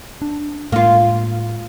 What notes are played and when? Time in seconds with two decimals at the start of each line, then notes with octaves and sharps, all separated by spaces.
0.22 D4
0.72 A2 G#3 A#3 F4